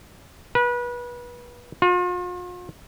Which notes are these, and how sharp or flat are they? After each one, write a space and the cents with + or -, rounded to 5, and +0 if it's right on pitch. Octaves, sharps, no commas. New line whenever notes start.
B4 -30
F4 +40